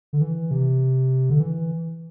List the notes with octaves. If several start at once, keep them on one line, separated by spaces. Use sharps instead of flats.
D3
E3
C3
D3
E3